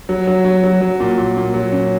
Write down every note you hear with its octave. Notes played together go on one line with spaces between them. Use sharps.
F#3
F#3
F#3
F#3
F#3
A#2
A#2
A#2
F#3
C#4